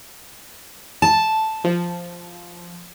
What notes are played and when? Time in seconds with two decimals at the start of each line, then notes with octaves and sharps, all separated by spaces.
1.02 A5
1.64 F3